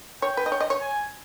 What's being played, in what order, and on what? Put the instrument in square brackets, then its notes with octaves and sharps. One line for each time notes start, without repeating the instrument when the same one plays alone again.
[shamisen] C#5 [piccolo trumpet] G5
[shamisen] B4
D#5
C#5
D#5
C#5
[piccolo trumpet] G#5